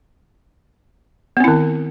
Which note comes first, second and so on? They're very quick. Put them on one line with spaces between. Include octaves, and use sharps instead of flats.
B3 C4 E4 D#3